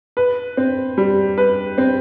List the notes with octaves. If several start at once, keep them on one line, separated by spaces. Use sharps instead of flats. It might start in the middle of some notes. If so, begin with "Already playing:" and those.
B4
C4
G3
B4
C4